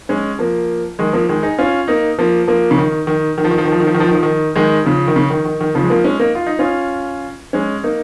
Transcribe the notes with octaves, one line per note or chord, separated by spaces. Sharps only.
G#3 C#4
F3 A#3
D#3 G#3
F3 A#3
D#3 G#3
D#4 G#4
C#4 F4
A#3 D#4
F3 A#3
F3 A#3
C#3
D#3
D#3
D#3
F3
D#3
F3
D#3
F3
D#3
F3
D#3
F3
D#3
F3
D#3
D#3 G#3
C#3 F3
D#3
C#3
D#3
D#3
D#3
C#3 F3
G#3
F3 A#3
G#3 C#4
A#3 D#4
F4
D#4
C#4 F4
G#3 C#4
A#3 D#4